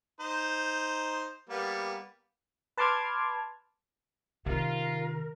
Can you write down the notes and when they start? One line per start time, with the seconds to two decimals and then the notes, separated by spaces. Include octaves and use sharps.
0.20 D#4 C5
1.50 G3 A#3 B3
2.77 B4 A5 C6 D6 F6 G#6
4.46 C3 D#3 F4 A#4